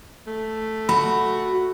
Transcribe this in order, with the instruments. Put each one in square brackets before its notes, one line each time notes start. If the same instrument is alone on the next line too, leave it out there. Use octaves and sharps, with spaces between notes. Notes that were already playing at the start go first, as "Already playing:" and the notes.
[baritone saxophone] A3
[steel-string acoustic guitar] F#4 [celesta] B5